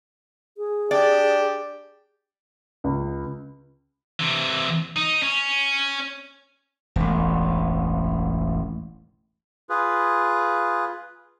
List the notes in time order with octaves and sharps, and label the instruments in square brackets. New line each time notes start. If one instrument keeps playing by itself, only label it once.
[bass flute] G#4
[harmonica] D4 G4 [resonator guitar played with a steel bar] D5
[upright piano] C#2
[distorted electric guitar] C3 E3
D#4
C#4
[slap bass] E1 A1
[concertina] F4 G#4 B4